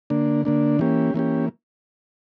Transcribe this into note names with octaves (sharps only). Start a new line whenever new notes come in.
D3 A#3 D4
D3 A#3 D4
E3 A#3 C#4 G4
E3 A#3 C#4 G4